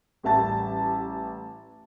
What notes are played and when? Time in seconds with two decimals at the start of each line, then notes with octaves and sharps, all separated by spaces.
0.23 A1 G3 E5 A5 A6